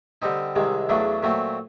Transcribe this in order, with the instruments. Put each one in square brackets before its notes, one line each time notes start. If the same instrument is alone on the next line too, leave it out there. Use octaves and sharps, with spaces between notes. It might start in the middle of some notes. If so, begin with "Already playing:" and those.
[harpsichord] D3 G3 C4 D#4
C2 C3 D#3 G#3
E2 C#3 F#3 A3 D4
A#2 F#3 A3 C4